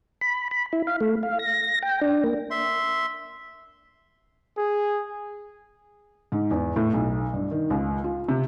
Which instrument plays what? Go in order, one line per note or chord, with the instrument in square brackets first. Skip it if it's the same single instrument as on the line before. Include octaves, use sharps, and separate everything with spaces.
[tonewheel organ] B5
B5
E4
F5
A3
F5
A#6
G5
D4
A#3
[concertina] E5 C6
[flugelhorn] G#4
[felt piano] G#2
E2
A2
B1
G2
D#3
C#2
F4
C3